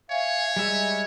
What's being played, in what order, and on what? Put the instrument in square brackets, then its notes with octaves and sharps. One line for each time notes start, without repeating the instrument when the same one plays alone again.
[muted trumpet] C#5 [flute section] E5 F5 G#5
[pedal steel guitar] G3 G#3 E5 [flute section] G#5